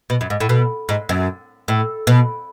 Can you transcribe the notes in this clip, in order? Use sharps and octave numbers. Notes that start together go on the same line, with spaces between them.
B2
F#2
G#2
A2
B2
G#2
F#2
A2
B2